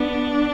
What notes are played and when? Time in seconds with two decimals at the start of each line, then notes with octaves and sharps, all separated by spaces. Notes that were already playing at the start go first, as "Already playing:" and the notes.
Already playing: B3 D4